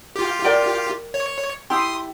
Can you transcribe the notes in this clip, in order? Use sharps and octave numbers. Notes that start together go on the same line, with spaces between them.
F4 G4
A#4 D5 G5
C#5
E4 G4 C6 D#6